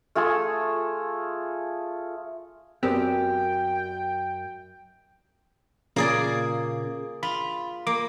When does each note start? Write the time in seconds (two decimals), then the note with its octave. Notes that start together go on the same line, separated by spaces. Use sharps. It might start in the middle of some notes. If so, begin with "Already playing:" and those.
0.15 A3 F4 G#4 A4
2.83 F#2 B3 C4 G4 A#4 D5 G5
5.96 A#2 C#3 A#3 G#4 D5
7.23 F4 B5
7.87 A#3 D6